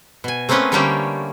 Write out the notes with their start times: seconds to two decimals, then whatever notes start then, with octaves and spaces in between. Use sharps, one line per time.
0.24 B2 G#5
0.49 A3 A#3 C4 C#4 B4 D#5
0.72 D3 G3 A3 A#3 C#4 G4